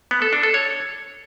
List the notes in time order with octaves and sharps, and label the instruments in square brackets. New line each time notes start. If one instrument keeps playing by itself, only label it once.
[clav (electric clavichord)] B3
A4
D4
A4
C#5